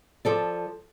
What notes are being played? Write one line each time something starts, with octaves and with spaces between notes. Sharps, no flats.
F3 A4 D5